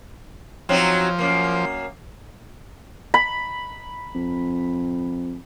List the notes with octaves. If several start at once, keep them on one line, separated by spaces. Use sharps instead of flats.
F3 F#3 C4 D#4
F#2 A#3
B5
F2